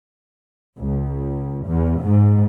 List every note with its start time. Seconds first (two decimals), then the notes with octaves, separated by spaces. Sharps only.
0.80 C#2
1.68 E2
2.04 G#2